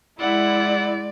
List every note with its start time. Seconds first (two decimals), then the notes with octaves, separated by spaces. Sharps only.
0.20 G#3 E4 D5 F#5